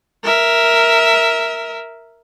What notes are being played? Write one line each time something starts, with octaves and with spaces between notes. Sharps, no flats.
A#4 E5